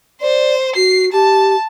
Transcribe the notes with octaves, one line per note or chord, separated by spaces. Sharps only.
C5 D5
F#4 C7
G4 A5